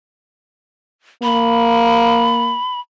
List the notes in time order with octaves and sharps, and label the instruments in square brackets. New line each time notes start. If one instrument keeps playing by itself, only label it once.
[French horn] A#3 [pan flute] B5